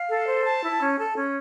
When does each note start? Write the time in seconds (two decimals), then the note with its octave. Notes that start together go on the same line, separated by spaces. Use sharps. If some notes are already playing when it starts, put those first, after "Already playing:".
Already playing: F5
0.09 A4
0.27 C5
0.45 A5
0.63 E4
0.81 C#4
0.98 A4
1.16 C#4